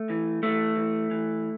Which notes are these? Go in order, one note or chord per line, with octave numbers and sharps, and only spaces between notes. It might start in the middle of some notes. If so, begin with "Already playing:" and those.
Already playing: A3
E3
E3 A3
E3
E3